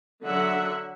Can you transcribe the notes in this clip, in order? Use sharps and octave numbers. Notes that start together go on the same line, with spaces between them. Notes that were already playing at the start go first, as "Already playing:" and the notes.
D3 F#3 E5 F#5